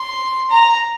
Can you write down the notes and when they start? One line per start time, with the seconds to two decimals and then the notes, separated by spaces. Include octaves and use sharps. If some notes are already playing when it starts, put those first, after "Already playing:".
Already playing: C6
0.50 A#5